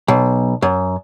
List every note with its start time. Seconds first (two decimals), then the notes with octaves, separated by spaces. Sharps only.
0.08 B1
0.62 F#2